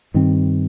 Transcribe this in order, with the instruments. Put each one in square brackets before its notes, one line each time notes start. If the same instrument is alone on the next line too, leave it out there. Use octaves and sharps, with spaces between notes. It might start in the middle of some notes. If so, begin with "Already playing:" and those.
[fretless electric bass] G2 D#3 C4